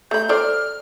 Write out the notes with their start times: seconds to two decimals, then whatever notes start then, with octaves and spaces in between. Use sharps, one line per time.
0.11 A3 B5 G6
0.29 A4 C5 D5 F6